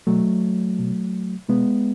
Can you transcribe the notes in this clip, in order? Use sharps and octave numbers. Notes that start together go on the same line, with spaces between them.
B2 F#3 A3
B2
B2 G#3 B3